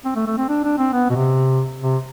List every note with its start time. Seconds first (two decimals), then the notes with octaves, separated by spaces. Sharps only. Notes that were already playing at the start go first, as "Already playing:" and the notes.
0.05 C4
0.16 A3
0.27 A3
0.38 C4
0.49 D4
0.64 D4
0.78 C4
0.93 B3
1.10 B2
1.16 C3
1.82 C3